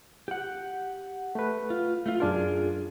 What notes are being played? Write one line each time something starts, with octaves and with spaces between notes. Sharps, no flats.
G4 F#5
A3 B4
F4
A3 F4
F#2 D4 F4 G#4 A#4